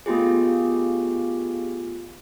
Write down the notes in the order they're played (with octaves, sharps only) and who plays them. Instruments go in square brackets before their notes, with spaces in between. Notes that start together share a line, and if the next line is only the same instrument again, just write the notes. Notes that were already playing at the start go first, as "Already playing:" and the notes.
[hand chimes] A3 B3 F4 G4 G#4